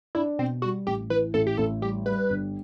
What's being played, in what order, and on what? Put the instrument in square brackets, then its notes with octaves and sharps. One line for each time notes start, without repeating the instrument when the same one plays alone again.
[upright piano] D4 [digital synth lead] E4
[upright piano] B2 [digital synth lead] C4
[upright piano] G3 [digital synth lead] F#4
[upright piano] A1 [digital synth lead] G4
[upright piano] E3 [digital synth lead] B4
[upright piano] A1 [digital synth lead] A4
[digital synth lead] G4
[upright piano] A1 [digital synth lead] A4
[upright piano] G3 [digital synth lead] G4
[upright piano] G3 [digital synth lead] B4
[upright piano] G1